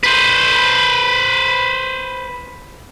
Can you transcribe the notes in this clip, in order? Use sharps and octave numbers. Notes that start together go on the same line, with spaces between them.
B4 C5